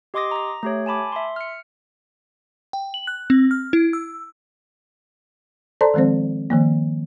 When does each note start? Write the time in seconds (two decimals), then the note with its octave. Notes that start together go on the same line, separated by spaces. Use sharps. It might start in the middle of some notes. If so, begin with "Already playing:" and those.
0.14 G4 D#5 C6 D6 D#6 A#6
0.31 A#5 A#6
0.63 A3 G4 C#5
0.86 G#5 A5 B5 D6
1.12 E5 C6
1.36 F6 C#7
2.73 G5
2.94 F#7
3.07 F#6
3.30 C4
3.51 F6
3.73 E4
3.93 E6
5.81 A4 C5 D5 A5 A#5 C6
5.94 D#3 F3 G#3 C4 C5
6.50 D#3 F3 A#3